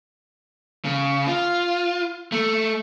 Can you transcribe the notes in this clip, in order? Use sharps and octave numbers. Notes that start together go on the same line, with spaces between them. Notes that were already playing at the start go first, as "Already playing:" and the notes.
C#3
F4
A3